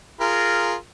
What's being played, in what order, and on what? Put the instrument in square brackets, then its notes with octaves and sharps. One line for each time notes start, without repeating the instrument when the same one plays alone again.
[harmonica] F4 G#4 A#4